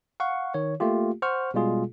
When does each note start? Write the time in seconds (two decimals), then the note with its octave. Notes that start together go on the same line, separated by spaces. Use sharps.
0.20 F5 F#5 C#6
0.54 D#3 C#5
0.80 A3 A#3 F4 G4
1.22 C5 F#5 C#6 F6
1.54 B2 G3 G#3 F4 G#4